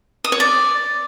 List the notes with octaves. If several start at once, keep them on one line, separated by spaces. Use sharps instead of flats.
D#6
C#5
D5